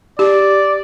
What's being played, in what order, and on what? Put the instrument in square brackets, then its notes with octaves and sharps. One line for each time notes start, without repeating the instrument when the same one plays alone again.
[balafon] G4 [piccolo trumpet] D5